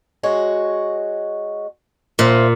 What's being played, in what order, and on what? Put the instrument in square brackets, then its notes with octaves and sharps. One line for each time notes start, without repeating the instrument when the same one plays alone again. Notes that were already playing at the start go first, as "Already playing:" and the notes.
[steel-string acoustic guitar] G#3 F#4 C#5
[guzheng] A#2 [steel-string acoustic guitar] C5 E5 F5